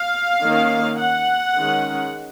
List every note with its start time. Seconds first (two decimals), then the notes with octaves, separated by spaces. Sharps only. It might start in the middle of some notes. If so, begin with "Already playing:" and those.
Already playing: F5
0.43 D#3 A#3 C#4
0.99 F#5
1.56 D#3 G#3 C#4